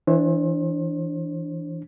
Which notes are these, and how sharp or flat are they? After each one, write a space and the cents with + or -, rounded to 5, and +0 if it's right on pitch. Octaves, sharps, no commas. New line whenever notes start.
E3 +0 D4 +0 C5 +35